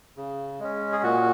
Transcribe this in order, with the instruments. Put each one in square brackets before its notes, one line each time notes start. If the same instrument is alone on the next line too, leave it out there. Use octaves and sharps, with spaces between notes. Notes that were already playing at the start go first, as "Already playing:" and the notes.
[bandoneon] C#3
G#3 C#4
G#4
A#2 F#4